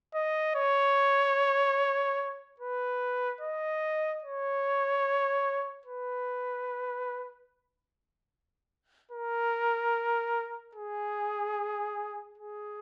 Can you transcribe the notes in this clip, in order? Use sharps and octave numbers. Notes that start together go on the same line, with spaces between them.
D#5
C#5
B4
D#5
C#5
B4
A#4
G#4
G#4